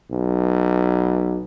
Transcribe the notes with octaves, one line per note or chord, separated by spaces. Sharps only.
B1